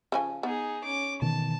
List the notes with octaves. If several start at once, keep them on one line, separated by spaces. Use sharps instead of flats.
C#3 F3 G#5
B3 D#4 G#4
C#4 D6
B2 D#3 E3 A5